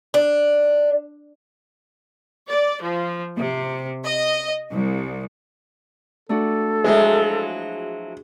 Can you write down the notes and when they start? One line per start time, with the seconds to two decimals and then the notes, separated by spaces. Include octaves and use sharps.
0.14 D4
2.47 D5
2.81 F3
3.38 C3
4.04 D#5
4.73 C2
6.29 A3 D4 F#4 A4
6.84 F3 F#3 G#3 E4 G#4